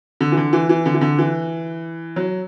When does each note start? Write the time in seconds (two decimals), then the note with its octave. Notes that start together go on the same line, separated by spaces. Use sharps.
0.21 D3
0.32 E3
0.37 D3
0.53 E3
0.69 E3
0.86 D3
0.94 E3
1.01 D3
1.19 E3
2.16 F#3